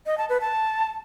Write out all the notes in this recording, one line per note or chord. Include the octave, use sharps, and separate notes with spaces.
D#5
A5
B4
A5